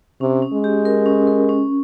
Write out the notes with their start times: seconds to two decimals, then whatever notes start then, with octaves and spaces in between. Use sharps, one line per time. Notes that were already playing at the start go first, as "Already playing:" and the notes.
0.21 C3 C#4
0.42 C#4
0.53 G#3
0.64 G4
0.85 A#4
1.06 C#4
1.27 A#4
1.49 C#4